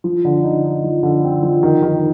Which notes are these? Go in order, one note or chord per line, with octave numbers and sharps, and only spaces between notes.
F3
D3
D#4
D#4
F3
D3
C4
F3
D#3
D#3